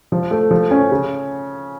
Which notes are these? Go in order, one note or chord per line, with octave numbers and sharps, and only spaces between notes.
F3
A3
F3
C#4
C#3